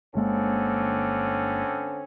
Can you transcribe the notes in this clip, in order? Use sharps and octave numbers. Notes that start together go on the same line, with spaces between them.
G1 D3 G#3 A#3 C4 C#4